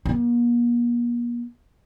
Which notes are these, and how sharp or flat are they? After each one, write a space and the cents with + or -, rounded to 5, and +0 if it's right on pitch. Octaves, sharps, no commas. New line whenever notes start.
A#3 +40